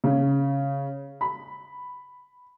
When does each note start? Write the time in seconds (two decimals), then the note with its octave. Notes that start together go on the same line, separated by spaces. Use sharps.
0.04 C#3
1.21 B5